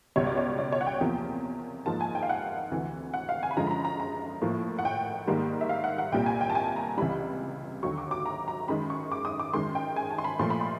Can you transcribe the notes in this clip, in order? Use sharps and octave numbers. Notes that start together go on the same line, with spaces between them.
C#2 B2 G3 C#5
D5
C#5
D5
C#5
F#5
G5
E2 C3 F3 A#3
G#2 F3 A#3 A5
G#5
G5
F5
F#5
D2 C3 E3
F#5
F5
G#5
B5
F#2 D3 F3 G#3 A#5
B5
A#5
A#5
A#5
A2 F3 A#3
F#5
G5
G#2 D#3 G3 A#3
E5
F5
F#5
F#5
C2 A#2 G3 A#3 G5
G#5
G5
A5
G#5
A#5
C#2 C3 E3 G3 B5
D#2 D3 F#3 C#6
D6
D6
A#5
A#5
F#2 D#3 G#3 B5
C#6
D6
D#6
D6
F#2 D#3 G#3 C6
G5
G#5
A5
C6
B5
A#2 F3 A3 C6
B5
C6